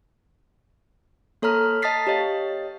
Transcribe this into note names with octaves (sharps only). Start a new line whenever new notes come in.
A#3 A4 C#5 A#5 F6 B6
D#5 A5 D#6 A6 B6 C7
G4 C#5 D#5 F5